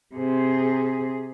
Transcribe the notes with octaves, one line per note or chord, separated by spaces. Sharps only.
C3 G#4